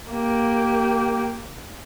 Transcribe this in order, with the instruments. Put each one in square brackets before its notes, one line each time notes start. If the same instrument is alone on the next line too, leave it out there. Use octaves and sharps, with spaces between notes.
[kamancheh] A#3 G4